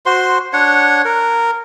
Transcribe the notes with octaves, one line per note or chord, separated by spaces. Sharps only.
F#4 C5 C6
D4 C#5 F#5
A#4